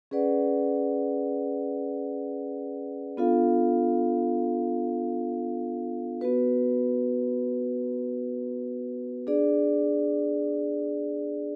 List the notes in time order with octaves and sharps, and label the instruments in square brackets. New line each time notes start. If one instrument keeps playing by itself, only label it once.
[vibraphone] C#4 G#4 B4 D5 F#5
B3 D4 F4 A4 F5
B3 F#4 B4
D4 G#4 D5